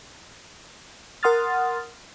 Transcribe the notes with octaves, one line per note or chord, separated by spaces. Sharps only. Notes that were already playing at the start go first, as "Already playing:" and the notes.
A#4 F#5 C6 D#6 F6 A6